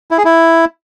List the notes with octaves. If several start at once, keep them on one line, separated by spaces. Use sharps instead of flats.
E4
G#4
E4